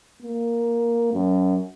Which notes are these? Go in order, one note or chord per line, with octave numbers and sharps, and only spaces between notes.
A#3
F#2